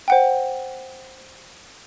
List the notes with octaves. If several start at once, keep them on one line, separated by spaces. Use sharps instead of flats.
C5 F#5 G5